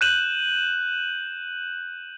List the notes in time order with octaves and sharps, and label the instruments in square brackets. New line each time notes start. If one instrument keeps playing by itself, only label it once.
[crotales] F#6 G6 D#7 E7 F#7